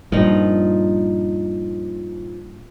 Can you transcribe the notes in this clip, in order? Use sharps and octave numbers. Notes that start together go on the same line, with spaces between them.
G2 A#2 F3 D#4